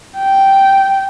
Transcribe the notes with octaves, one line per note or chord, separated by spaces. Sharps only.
G5